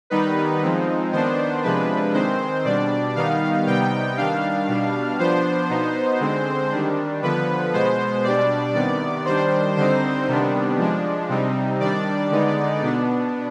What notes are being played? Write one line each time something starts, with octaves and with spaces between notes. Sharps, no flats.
D#3 G3 B3 D#4 B4
F3 G#3 C4 D#4
D#3 B3 D4 C5
C3 F3 G#3 D4 B4
D#3 G#3 C4 C5
B2 G3 D4 D5
D#3 G3 B3 D#4 F5
C3 G3 B3 D#4 G5
D#3 G3 D4 F5
B2 G3 D4
F3 B3 D4 C5
B2 B3 D#4
D3 G#3 C4
D#3 G3 D4
D3 F3 B3 B4
B2 G#3 B3 C5
B2 G3 D4 D5
C3 D#3 B3 D5
D#3 G3 D4 C5
D3 G3 C4 D#4 C5
C3 D#3 G3 B3 D4
F3 G#3 D4
C3 G3 C4 D#4
D#3 G3 D4 D5
D3 G#3 B3 D#4
B2 B3 D4